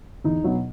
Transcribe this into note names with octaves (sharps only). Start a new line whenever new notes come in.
E2 D#4
B2 F#3